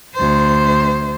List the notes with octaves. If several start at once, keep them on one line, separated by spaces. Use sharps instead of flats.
D2 C5